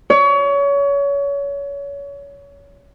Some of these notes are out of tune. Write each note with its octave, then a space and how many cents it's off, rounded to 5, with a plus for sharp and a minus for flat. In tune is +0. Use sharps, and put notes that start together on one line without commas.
C#5 +30